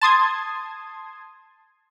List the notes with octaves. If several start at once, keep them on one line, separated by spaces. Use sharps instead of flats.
A5 C6 D#6 G#6